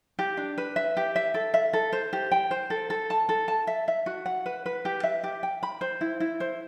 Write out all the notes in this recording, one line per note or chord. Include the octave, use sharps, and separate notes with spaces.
G4
D4
B4
E5
G4
E5
A4
E5
A4
C5
G4
G5
C5
A4
A4
A5
A4
A5
E5
E5
F#4
F#5
B4
B4
G4
E5
G4
G5
B5
C5
E4
E4
C5